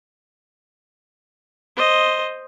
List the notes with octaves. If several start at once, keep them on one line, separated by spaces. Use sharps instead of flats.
C5 D#5